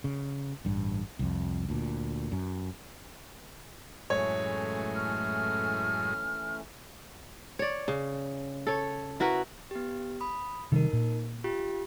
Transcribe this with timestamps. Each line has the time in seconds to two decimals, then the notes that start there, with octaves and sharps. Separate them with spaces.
0.04 C#3
0.65 A1 G2
1.19 C2 F2
1.69 D2 A#2
2.32 F#2
4.10 F#2 A2 E3 G#3 A3 C#4 C#5
4.94 F6
7.59 C#5 D5
7.88 C#3
8.67 A4 C#5
9.20 E4 F#4 A#4 B4
9.71 B3 G4
10.21 B5 D#6
10.72 C3 D#3 G3 D#4 A#4
10.93 A#2
11.44 F4 G4